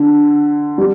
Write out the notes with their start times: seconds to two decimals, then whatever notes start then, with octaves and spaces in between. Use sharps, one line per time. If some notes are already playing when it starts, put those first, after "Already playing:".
Already playing: D3
0.78 G3